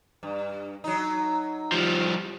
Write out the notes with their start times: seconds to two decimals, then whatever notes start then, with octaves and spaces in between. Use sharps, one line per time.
0.23 G2
0.84 F#3 D#4
1.72 F3 G3